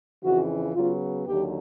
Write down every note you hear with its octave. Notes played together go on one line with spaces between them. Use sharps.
F2 C#3 E3 F#4
C#3 F#3 B3 F4
D#2 D3 F#3 G4